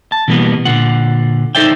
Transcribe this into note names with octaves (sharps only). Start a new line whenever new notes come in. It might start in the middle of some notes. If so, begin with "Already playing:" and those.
A5
B2 E3 G3 A#3 B3
A#2 D3 F4 F#5
D#4 A4 C5 D5 E5 G5